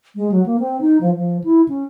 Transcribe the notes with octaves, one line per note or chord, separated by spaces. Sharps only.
G#3
F#3
A#3
C4
D#4
F3
F3
E4
C#4